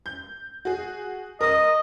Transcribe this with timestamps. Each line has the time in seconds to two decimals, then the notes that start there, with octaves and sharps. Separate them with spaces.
0.06 G6
0.65 F#4 G#4
1.41 A#4 D#5 D#6